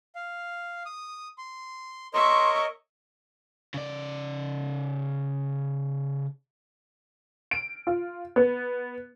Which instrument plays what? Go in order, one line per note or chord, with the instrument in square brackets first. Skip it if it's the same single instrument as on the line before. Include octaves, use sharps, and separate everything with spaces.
[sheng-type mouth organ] F5
D#6
C6
[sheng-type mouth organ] A#4 C#5 D#5 [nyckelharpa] E5 C#6 [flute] C6
[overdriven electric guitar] C#3 D5
[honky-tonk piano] D7
F4
B3